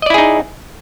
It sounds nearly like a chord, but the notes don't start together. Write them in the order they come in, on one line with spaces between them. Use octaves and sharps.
D#5 D5 E4 G#4 D#4